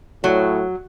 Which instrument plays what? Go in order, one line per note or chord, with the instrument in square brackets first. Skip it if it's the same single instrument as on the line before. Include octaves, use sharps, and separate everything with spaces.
[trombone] A2 [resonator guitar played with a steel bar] F#3